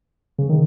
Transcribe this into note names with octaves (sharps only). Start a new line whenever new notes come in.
C#3
D#3